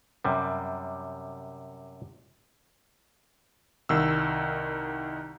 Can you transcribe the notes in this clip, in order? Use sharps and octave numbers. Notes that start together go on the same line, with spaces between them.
F#2 C3 G3
C2 D#3 E6